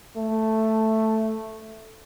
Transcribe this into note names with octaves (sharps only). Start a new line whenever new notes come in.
A3